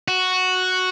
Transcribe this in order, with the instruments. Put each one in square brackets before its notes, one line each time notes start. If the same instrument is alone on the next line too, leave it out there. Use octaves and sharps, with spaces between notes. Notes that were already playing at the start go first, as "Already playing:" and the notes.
[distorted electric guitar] F#4